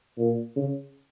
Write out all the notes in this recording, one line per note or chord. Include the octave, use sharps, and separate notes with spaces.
A#2
C#3